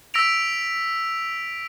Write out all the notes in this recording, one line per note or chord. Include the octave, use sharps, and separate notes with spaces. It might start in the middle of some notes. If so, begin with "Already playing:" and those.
E6 A#6 B6 D7 F7